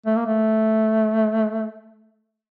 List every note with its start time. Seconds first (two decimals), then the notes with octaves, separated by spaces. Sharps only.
0.06 A3
0.16 A#3
0.26 A3